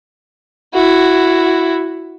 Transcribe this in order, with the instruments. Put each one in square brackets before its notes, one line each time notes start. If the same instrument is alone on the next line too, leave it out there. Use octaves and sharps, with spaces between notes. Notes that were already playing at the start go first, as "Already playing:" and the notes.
[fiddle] E4 F#4